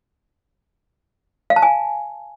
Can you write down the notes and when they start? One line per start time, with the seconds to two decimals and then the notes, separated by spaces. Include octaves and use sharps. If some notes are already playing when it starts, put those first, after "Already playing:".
1.50 F5
1.56 A5
1.62 G#5